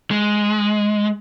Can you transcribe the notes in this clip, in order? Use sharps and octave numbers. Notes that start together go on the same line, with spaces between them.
G#3